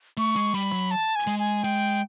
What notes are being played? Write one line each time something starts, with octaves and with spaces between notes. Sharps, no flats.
A3 C#6
G#3
G3 B5
F#3
A5
G#5
G#3
G#5
G#3 G5